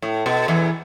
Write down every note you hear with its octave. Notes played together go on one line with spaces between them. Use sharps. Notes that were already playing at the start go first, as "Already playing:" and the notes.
A2
B2
E2 E3